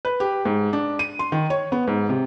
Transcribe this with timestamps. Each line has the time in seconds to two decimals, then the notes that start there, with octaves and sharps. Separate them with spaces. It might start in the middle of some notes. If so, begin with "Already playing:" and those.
0.05 B4
0.20 G4
0.45 G#2
0.73 D4
0.99 D#7
1.19 C6
1.32 D#3
1.50 C#5
1.72 B3
1.88 G#2
2.09 C3